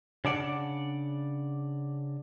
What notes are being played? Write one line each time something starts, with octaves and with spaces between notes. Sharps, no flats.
C#3 D4 D5 F#5